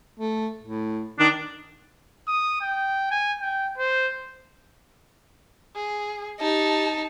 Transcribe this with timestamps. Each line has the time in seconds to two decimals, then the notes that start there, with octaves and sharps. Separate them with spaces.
0.19 A3
0.63 A2
1.19 D#3 D4
2.28 D#6
2.62 G5
3.11 G#5
3.41 G5
3.78 C5
5.75 G#4
6.40 D#4 G4 A5